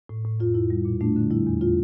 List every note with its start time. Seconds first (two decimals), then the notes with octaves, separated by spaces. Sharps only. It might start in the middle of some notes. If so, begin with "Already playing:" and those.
0.09 A2
0.25 A2
0.40 F2 F4
0.54 F2 E4
0.70 G3
0.85 A#2
1.01 A3 D4
1.16 D3
1.31 G3 E4
1.47 E2
1.61 F4